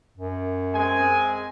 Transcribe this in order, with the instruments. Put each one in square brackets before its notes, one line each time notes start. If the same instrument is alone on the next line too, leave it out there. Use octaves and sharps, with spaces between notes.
[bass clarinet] F#2
[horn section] G#3 C4 G#5